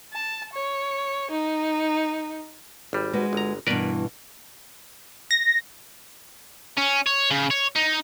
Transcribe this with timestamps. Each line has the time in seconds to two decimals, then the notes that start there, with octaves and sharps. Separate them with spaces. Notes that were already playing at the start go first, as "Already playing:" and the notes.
0.13 A5
0.53 C#5
1.31 D#4
2.93 G#1 G3
3.13 G#3 F#4 B4
3.33 G1 A#5
3.67 G2 B2 E3 A#4 B4 D5
5.31 A#6
6.77 C#4
7.07 C#5
7.31 C#3
7.50 C#5
7.75 D#4